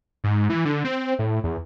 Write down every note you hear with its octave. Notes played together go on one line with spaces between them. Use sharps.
G#2
E3
D3
C4
A2
E2